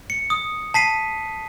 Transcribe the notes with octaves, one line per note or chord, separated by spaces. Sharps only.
C#7
D#6
A5 B6 C7 D#7